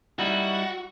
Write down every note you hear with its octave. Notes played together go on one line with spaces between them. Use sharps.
G3 D#4 E4 F#4